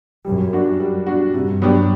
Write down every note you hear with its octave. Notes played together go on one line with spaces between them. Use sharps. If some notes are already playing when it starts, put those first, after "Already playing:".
F#2 G3
D4 F#4
G3
D4 F#4
G2 C3
F#3 B3 D4 G4